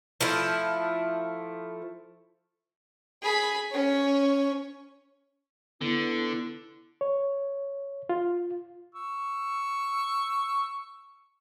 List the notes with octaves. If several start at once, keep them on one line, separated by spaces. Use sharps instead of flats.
F3 A3 E4
G#4 B5
C#4 C#5
D3 B3 E4
C#5
F4
C#6 E6